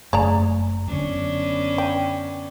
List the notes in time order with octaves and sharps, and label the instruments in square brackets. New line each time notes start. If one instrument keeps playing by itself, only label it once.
[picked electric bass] F#1 [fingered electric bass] A3 [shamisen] G#4 D5 A#5
[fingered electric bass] F#2 D3 [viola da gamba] B3 C#4 D4
[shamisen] G5